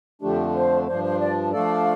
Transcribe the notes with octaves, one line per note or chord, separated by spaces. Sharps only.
F2 D3 F3 A3 D4 G4
C5
G2 F3 D4 C5
C5
D5
F3 A3 D4 A4 D5 F5